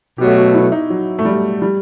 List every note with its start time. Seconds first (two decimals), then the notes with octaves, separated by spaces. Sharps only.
0.18 B2 F#3 A3 G4
0.36 F#4
0.54 E4
0.72 D#4
0.90 F#3
1.19 A3
1.25 G3
1.62 G3